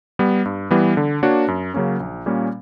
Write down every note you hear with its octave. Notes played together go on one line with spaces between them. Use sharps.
G3 B3
G2
E3 G3 B3
D3
A#3 D4 F#4 C#5
F#2
C#3 F#3 A#3 C#4
A#1
A#2 G3 A#3 C#4